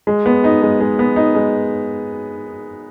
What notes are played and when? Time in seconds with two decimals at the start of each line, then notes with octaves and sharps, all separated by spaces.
0.07 G#3
0.26 B3
0.44 D#4
0.62 G#3
0.80 G#3
0.99 B3
1.16 D#4
1.35 G#3